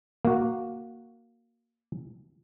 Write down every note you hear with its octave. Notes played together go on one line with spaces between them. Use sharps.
A#3 F#4